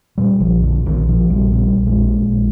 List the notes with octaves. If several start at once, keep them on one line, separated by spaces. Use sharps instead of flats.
A#2 G3
A#1 F3
A#2 D3
A#1 D#3
A#2 F3
A#1 G3
A#2 G3
A#1
G#3
A#2
A#1